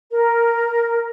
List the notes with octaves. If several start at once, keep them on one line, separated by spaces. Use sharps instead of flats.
A#4